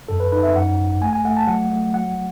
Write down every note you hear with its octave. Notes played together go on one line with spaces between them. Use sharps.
F#2 A4
B4
D#4 B4
E5
F#2 F#5
G#1
A3 G#5
G#5
A3 F#5
A5
F#3 F#5
A3
F#3 F#5